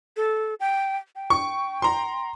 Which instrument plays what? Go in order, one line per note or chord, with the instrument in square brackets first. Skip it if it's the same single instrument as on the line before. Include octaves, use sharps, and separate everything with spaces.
[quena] A4
G5
G5
[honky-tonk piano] C#6
A#5 C6